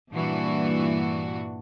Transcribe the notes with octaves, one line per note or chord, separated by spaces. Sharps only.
G2 A#2 E3 D4 F#4